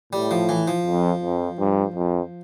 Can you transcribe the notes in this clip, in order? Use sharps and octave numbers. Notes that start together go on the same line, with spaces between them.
A2 G3
F3
E3
F3
F2
F2
G2
F2